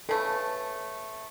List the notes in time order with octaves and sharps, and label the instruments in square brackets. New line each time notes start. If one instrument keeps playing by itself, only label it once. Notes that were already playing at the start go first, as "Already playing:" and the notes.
[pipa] C#3 A3 [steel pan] A4 B4